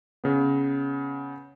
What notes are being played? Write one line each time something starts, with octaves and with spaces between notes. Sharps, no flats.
C#3 B3